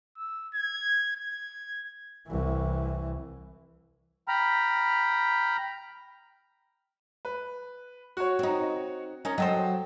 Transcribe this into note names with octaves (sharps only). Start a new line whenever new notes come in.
E6
G#6
G#6
C2 E3
G5 A#5 B5 F6
B4
F#4 C#5
C4 D#4
C#4 D#4 A#4
F#3 A4 C5 D#5 G5